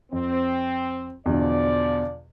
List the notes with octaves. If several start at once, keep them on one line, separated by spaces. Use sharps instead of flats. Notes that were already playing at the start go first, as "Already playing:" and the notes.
F2 C4
E2 B2 D3 F3 D5